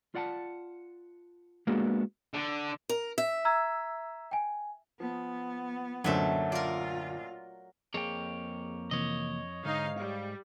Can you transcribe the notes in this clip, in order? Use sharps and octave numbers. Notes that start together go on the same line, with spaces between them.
F4 D5 F#5 G5 A5
G#3 A#3 B3 D4 F#4 G#4
D3
A#4
E5
A#5 E6 G#6
G5 G#5
F3 B3
A1 F#2 A#2 D3 F#3 A3 C5 E5
F4 A#4 D5
F2 A#3 G#4 C#5 G5
C3 E3 A#3 C#5 D#5
G#2 D3 D#4 F5
G3 F5